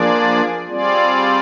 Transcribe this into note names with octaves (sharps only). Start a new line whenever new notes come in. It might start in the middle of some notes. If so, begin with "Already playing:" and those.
Already playing: F3 A#3 D4 G#4 D5
G3 C4 F4 G#4 D5